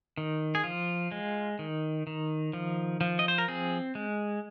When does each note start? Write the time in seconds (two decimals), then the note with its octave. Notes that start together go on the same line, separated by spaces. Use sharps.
0.18 D#3
0.55 G#4
0.64 F3 F4
1.12 G#3
1.59 D#3
2.07 D#3
2.53 F3
3.01 F3
3.19 D#5
3.28 C5
3.38 A#4
3.48 C4 G#4
3.95 G#3